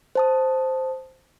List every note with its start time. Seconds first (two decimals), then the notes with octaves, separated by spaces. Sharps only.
0.15 C5 A5 D#6